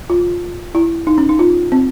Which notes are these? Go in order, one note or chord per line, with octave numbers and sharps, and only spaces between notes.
F4
E4
D#4
C#4
D#4
F4
C4